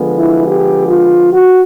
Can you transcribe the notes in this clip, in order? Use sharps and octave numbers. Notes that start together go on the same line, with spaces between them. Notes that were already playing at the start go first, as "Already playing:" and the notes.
Already playing: D3 F3 G#3 B3
E4
G4
F4
F#4